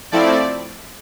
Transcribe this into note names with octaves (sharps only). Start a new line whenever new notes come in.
F3 A3 C4 E4 D5